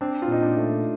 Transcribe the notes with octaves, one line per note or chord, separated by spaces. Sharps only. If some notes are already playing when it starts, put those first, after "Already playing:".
C4 D4
F4
A#2 D#4
D4
A3